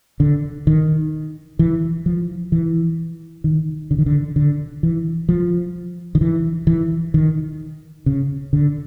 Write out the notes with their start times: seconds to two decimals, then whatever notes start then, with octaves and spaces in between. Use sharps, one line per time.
0.20 D3
0.67 D#3
1.59 E3
2.06 F3
2.52 E3
3.44 D#3
3.91 D3
3.98 D#3
4.06 D3
4.36 D3
4.83 E3
5.29 F3
6.15 D#3
6.21 E3
6.67 E3
7.14 D#3
8.06 C#3
8.53 D3